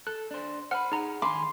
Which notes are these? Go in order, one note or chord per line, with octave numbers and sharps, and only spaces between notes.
A4 F#6
D4 C5
C5 F#5 G5 B5 F6
D#4 G#4 F#5 A#5
D#3 G#5 B5 C6 D6